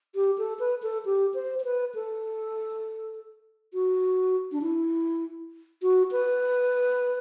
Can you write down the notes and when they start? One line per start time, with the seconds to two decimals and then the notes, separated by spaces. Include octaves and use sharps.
0.15 G4
0.38 A4
0.59 B4
0.83 A4
1.05 G4
1.34 C5
1.60 C5
1.64 B4
1.95 A4
3.74 F#4
4.52 D4
4.62 E4
5.82 F#4
6.12 B4